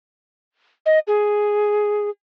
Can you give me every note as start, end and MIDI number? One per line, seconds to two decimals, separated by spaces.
0.86 0.99 75
1.07 2.10 68